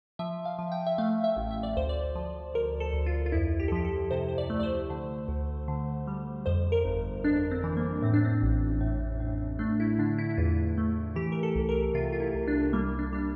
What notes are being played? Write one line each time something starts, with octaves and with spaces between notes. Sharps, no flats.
F3 E5
F5
F3
G5
E5
A3 F5
E5
A1
E5
D5
D2 C5
D5
F3
D2 A#4
A4
D2
F4
F4
F2 E4
G4
A4
F3 G4
A4
C3 C5
C5
D5
A3
D5
C5
D3
D2
D3
G3
F2 C5
A#4
G1
F2 D4
C4
E3
A#3
A2 C4
D4
C4
A1
A2
A2
A3 D4
E4
D3 D4
E4
E4
E2 F4
A3
E3 G4
A#4
A4
C2
A#4
C3 F4
F4
E4
C2
D4
G3 A#3
D4
G3 D4